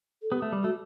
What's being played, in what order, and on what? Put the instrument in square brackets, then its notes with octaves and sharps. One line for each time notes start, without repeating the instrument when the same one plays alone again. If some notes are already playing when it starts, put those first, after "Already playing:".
[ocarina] A4
[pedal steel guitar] B3 [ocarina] G4
[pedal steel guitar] A3
G3
[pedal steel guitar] A3 [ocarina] F#4